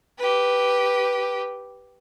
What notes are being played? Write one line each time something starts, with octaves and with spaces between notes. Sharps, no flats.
G4 B4